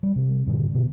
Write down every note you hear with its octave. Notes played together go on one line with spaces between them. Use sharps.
G3
C3
G2 A#2 D3
B2